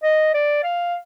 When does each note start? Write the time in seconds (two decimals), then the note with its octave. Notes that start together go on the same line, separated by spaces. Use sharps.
0.03 D#5
0.34 D5
0.64 F5